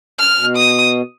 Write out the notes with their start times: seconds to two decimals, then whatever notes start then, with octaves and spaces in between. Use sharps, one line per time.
0.19 F6
0.37 B2
0.57 D#6